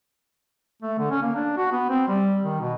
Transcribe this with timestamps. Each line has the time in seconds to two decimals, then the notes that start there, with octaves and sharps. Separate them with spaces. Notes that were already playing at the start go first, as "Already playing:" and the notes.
0.82 A3
0.99 D3
1.11 C#4
1.22 A#3
1.35 D4
1.57 F#4
1.72 B3
1.89 C4
2.08 G3
2.43 D#3
2.61 B2